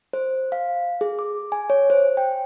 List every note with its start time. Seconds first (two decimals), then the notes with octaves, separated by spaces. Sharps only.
0.13 C5
0.52 F5
1.01 G#4
1.19 D6
1.52 G#5
1.70 C#5
1.90 C5
2.17 G5